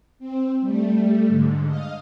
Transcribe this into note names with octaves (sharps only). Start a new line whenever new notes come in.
C4
G3 A3
G#2 D3
D#5 F5